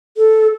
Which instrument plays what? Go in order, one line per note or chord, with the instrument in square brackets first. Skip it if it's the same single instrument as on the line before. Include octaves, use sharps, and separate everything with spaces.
[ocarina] A4